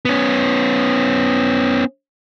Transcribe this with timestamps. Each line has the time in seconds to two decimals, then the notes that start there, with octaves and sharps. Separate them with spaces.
0.05 B3 C#4